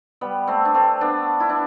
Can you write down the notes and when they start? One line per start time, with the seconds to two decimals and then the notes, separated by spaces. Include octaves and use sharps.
0.21 G3 B3
0.47 A3 C4
0.65 D4
0.75 A3 C4
1.01 B3 D4
1.40 E4
1.49 D4